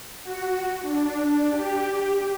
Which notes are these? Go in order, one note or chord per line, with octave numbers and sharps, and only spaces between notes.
F#4
D4
G4